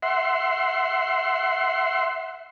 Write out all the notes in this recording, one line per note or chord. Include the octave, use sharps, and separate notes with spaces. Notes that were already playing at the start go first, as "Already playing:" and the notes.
E5 F#5 C6